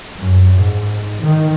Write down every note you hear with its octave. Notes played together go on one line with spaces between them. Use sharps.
F#2
G#2
D#3